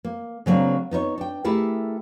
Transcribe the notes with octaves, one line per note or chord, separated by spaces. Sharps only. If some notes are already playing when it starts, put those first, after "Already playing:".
A#3
C#3 F#3 A#3 C4 D4
B3 D#4 E4 C#5
D4 G5
A3 E4 G4 G#4 A#4